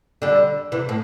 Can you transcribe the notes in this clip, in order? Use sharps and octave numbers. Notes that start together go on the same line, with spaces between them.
D3 G3
C3 E3
A2